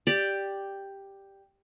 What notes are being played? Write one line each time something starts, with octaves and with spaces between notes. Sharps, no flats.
G4 D5